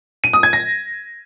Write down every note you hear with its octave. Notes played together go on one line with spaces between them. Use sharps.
D#7
D#6
G#6
A#6